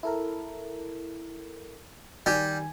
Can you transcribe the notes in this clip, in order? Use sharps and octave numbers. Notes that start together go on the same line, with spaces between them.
E4 A4 A#4
D#3 G3 G#5